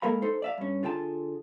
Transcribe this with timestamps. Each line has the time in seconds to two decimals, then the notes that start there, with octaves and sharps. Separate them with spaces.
0.02 G#3 A#3 A4 A#4 F5 B5
0.22 D#4 A4 C5
0.42 D5 E5 F5
0.58 G2 C#4
0.83 D3 F4 G#4 G5 A5